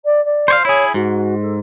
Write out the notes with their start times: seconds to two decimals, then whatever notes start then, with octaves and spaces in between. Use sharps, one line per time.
0.04 D5
0.25 D5
0.48 C5 C#5 F5
0.65 E4 G#4 C#5
0.94 G#2 F#4
1.41 A4